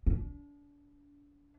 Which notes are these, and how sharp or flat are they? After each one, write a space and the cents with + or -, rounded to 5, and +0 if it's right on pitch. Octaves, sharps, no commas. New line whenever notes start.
D4 -30